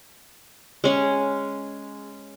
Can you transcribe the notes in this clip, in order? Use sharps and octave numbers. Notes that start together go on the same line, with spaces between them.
G#3 C#4 G#4